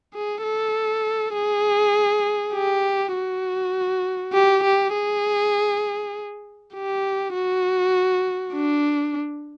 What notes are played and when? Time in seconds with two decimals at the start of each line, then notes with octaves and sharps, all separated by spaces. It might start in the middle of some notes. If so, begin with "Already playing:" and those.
0.14 G#4
0.44 A4
1.34 G#4
2.53 G4
3.14 F#4
4.33 G4
4.64 G4
4.93 G#4
6.74 G4
7.33 F#4
8.54 D4